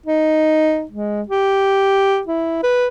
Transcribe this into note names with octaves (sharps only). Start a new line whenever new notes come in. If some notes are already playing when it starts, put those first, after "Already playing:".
D#4
G#3
G4
E4
B4